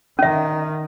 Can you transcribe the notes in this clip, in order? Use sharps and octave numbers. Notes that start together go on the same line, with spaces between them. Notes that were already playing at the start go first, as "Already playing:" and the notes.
D#3 C#4 E5